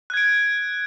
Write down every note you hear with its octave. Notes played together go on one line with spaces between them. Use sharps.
F#6 G#6 D7